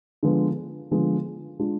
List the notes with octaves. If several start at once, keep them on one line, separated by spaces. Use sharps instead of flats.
D3 F3 G#3 B3
D3 F3 G#3 B3
G#3 D4 F4